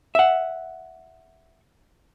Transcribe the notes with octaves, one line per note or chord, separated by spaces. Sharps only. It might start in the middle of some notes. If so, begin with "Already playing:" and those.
E5 F#5